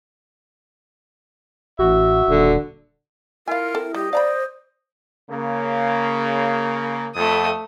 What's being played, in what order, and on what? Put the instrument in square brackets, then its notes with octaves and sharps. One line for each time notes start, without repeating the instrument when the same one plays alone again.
[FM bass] A1 [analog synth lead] F#4 [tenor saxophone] E5
[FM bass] D#1 [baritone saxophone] D3
[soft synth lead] E4 [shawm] F4 [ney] A#4 [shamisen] F5 G#5
[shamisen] C4 A4
[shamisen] G3 [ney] G4 [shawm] D#5
[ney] C5 [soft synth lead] D5 [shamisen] F5 A#5 B5
[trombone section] C#3 A#3
[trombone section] F2 [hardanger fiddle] A3 D#6